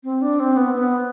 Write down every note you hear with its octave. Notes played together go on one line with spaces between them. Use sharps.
C4
D4
C4
B3
B3